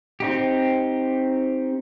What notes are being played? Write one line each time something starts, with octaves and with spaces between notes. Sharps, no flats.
C4 D#4 G4